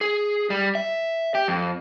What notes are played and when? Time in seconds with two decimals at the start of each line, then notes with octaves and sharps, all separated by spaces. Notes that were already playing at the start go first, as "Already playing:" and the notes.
0.01 G#4
0.50 G3
0.75 E5
1.35 G4
1.48 F2